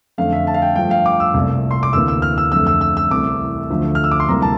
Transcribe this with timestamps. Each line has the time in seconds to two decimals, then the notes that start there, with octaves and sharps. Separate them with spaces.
0.18 F2 D3 A3 F5
0.33 E5
0.47 A5
0.54 F5
0.62 G5
0.76 G2 F3 A3 G5
0.91 F5
1.06 D6
1.20 E6
1.34 C2 A#2 A3
1.71 C6
1.83 D6
1.93 D2 C3 E3 A#3 E6
2.08 E6
2.22 F6
2.38 E6
2.52 F2 D3 A3 E6
2.67 E6
2.81 E6
2.97 E6
3.10 C2 C3 E3 A3 D6
3.70 D2 D3 F3 A3
3.95 F6
4.04 E6
4.12 D6
4.20 C6
4.28 D2 C3 E3 G3 A#3 A#5
4.42 A5